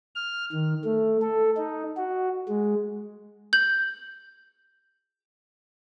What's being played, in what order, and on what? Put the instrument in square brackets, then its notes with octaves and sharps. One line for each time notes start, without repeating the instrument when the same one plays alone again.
[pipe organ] F6
D#3
A3
A4
D#4
F#4
G#3
[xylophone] G6 F#7